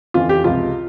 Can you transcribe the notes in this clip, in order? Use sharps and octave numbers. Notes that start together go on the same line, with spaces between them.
F2 C#3 E3 F4
G4
C#2 C3 F3 F4